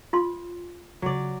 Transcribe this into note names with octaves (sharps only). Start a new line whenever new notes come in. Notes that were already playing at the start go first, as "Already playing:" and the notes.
F4 C6
C#3 F#3 C#4 D5